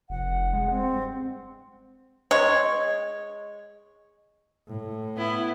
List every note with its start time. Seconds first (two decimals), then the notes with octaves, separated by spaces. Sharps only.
0.10 F1 F#5
0.53 G#3
0.70 C4
0.93 G2
2.31 G#3 C#5
4.68 A2
5.17 B3 E4